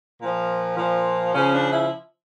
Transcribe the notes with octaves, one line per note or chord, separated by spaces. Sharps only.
A#2 F3
A#2 F3
C#3 F3 C#4
D4
E4